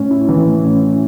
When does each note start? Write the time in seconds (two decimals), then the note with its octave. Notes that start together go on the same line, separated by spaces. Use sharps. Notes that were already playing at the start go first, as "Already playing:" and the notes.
Already playing: A2 C#4
0.11 E4
0.29 E3
0.46 A2
0.64 C#4
0.82 E4